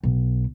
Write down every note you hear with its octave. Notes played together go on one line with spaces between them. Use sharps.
B1